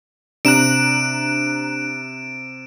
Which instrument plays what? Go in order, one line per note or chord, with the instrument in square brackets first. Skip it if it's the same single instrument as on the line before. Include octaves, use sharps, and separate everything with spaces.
[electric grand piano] C3 [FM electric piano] D4 A#5 F#6 [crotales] D7 E7